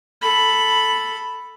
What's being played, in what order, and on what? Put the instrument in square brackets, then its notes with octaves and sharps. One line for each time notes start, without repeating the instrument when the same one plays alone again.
[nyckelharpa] A4 B5